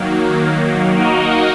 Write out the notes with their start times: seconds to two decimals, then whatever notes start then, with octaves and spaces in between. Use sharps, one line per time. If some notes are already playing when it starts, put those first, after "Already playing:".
Already playing: D#3 F#3 A#3
0.97 A#3 D#4 F#4 A#4 D#5